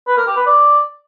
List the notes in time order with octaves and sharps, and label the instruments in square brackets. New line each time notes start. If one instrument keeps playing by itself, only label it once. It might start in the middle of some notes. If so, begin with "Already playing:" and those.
[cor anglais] B4
A#4
G4
B4
D5